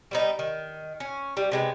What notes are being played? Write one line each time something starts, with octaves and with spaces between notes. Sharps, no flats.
G3 B3 D#4
D#3
C#4
G3
C3 G#3 B3